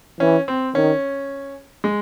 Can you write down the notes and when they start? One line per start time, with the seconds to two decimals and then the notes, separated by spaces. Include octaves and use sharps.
0.20 E3 C#4
0.48 C4
0.75 D#3 C#4
1.84 G#3